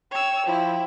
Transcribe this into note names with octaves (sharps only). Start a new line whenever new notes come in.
C#5 G5 E6
F3 E4